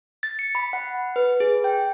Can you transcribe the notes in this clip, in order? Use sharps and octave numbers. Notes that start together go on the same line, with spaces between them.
A6
C#7
B5
F#5
B4
G#4
G5